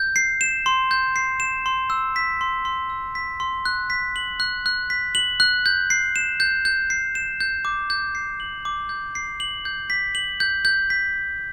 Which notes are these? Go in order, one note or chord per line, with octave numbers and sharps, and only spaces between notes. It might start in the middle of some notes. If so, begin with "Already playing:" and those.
Already playing: G6
C7
E7
C6
G6
C7
E7
C6
E6
B6
C6
C6
E6
B6
C6
F#6
B6
F#7
F#6
F#6
B6
F#7
F#6
G6
C7
E7
G6
G6
C7
E7
G6
D6
G6
C7
F#7
D6
G6
C7
F#7
G6
B6
F#7
G6
G6
B6